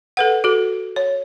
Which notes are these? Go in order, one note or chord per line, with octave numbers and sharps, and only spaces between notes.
A4 B4 F#5
F#4 A4
C#5